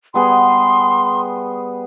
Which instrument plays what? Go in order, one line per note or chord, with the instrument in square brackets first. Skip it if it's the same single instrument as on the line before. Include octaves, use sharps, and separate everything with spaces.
[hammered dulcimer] G3 B3 G#4 [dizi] C6